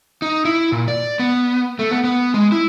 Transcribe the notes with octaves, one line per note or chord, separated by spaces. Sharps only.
D#4
E4
A#2
D5
B3
A3
B3
B3
G#3
E4